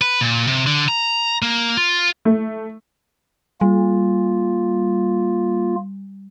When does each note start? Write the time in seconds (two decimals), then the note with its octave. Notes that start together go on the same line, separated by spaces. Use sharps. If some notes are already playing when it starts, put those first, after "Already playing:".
0.01 B4
0.21 A#2
0.47 C3
0.67 D3
0.88 A#5
1.42 A#3
1.77 F4
2.25 A3
3.61 G3 A#3 F4